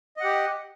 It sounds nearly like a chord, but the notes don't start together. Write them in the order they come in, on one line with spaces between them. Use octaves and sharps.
D#5 F#5 G4